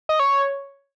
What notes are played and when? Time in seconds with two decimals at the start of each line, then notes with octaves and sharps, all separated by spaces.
0.09 D#5
0.20 C#5